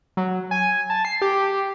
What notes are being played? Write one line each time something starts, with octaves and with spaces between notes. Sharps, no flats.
F#3
G#5
A5
C7
G4